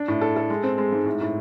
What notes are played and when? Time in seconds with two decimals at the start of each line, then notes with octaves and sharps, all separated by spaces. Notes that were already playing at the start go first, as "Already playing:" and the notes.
Already playing: D4
0.08 A2
0.21 A4
0.36 A4
0.50 G#3
0.63 C4
0.78 G#3
0.92 G#2
1.06 A2
1.21 A2